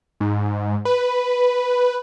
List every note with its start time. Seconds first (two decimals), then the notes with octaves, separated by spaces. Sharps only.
0.21 G#2
0.85 B4